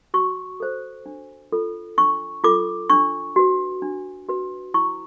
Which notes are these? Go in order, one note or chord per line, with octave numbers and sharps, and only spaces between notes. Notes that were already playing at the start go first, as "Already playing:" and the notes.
F#4 C#6
A4 C5
D4
F4 A4
D4 C#6
F4 A4 D6
D4 C#6
F#4 B4
D4
F#4 B4
E4 C#6